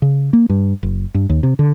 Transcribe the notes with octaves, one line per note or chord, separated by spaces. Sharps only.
C#3
A#3
G2
F#1
G2
D#2
C3
D3